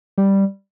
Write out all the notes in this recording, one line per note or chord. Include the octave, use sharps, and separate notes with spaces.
G3